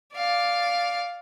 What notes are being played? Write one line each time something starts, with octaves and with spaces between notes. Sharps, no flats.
D5 F5